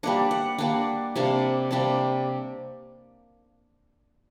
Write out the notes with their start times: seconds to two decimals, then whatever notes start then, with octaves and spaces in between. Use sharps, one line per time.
0.03 G3 A#3 D4 F#5
0.31 F#5
0.58 G3 A#3 D4 F#5
1.16 C3 G3 A#3 D4
1.71 C3 G3 A#3 D4